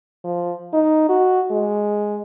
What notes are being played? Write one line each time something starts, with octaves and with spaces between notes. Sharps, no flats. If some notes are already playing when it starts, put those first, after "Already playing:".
F3
D#4
F#4
G#3